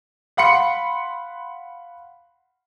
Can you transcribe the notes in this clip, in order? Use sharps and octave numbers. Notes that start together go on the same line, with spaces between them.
F5 F#5 B5 C6 C#7